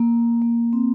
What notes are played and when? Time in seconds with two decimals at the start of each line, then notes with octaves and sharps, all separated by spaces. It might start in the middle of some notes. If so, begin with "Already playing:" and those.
Already playing: A#3
0.42 A#3
0.73 C4